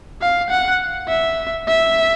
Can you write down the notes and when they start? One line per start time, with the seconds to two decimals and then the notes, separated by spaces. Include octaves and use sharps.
0.21 F5
0.50 F#5
1.08 E5
1.68 E5